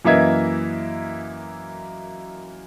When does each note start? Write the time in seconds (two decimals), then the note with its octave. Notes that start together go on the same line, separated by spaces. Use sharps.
0.05 F#2 E3 A#3 D#5 E5 G#6